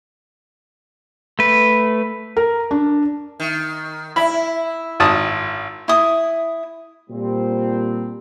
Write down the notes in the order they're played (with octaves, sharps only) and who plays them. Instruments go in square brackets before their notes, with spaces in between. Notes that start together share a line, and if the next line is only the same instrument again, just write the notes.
[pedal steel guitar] A3 B4
[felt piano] A#4
D4
[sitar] D#3
[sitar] E4 [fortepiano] B5
[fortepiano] G#1 A5 D#6
[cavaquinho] E4 D#6
[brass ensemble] A#2 G3 C4